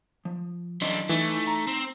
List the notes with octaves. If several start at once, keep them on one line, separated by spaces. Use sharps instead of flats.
F3
E3 F#3 C#4 D4 D#5 C6
E3 A3 D#4
A#5
C4